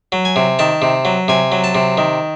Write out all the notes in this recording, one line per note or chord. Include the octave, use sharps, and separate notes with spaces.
F#3
G#5
C3
D#3 A5
C3
F#3
C3 G#5
F#3
A5
C3
D#3